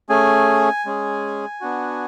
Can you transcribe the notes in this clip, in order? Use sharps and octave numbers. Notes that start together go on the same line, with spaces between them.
A3 C#4 G#4 G#5
G#3 C#4 G#4
B3 D4 F#4